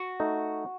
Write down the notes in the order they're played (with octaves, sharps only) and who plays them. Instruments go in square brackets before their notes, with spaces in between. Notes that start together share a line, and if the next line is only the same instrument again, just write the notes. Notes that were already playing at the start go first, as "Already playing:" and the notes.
Already playing: [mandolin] F#4
[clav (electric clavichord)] A3 D#4